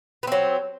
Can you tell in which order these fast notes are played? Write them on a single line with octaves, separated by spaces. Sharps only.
B3 C4 F#3